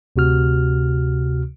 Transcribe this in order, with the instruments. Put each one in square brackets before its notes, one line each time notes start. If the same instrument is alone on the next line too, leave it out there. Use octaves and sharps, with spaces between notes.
[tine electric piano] D2 C3 F#4 F6